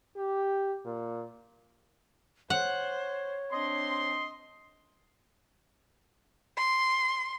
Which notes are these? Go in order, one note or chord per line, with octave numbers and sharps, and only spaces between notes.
G4
A#2
C5 C#5 F#5
C4 D4 D#5 C6
C6